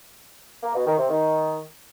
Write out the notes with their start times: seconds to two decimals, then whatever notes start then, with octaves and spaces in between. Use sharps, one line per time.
0.63 A#3
0.75 B2
0.86 D#3
0.98 C3
1.09 D#3